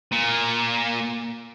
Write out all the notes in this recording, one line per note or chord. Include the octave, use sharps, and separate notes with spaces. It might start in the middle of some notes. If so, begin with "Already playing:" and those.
A#2